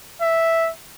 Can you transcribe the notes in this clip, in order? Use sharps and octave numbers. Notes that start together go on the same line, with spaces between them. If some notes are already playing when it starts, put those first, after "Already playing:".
E5